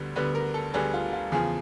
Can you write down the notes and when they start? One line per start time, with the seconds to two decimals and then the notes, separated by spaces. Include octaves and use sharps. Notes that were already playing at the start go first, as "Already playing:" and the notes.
Already playing: D2 D3 G3 B3
0.15 D2 D3 G3 B3 B4
0.35 A#4
0.54 A4
0.74 D2 D3 G3 B3 G#4
0.94 F4
1.13 F4
1.32 E2 C#3 F3 G#4